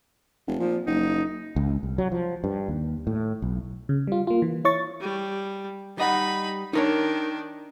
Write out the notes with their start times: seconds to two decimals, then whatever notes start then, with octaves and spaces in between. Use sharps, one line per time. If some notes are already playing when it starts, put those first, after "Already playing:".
0.48 F1
0.60 A#2 F3
0.86 F#1 D#4
1.56 C#2
1.83 C2
1.98 F#3
2.12 F3
2.44 G2
2.68 D#2
3.07 A2
3.42 B1
3.89 C#3
4.07 G3 F4
4.27 A#3 F4
4.42 E3
4.65 E4 C#5 C#6 A6
5.00 G3
5.98 G3 D#4 D#5 F#5 B5
6.73 D#3 D4 D#4 A#4 C#5